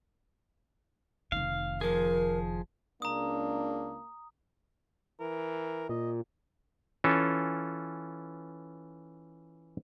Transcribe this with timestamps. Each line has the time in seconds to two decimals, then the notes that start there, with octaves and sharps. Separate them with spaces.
1.32 F1 D#3 F5
1.81 F3 G#4 A#4
3.02 C#2 A#3 D4 A#5 D#6
5.20 E3 A#4
5.89 A#2 D#5
7.04 E3 C#4 F4 A4